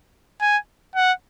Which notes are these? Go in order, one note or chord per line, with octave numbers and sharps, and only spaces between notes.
G#5
F#5